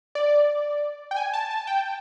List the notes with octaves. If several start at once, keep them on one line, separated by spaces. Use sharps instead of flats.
D5
G5
G#5
A5
A5
G5